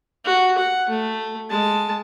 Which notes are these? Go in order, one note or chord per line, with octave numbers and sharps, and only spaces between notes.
F#4
F#5
A3
G#3 A5